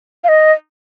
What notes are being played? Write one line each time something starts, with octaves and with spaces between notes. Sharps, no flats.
F5
D#5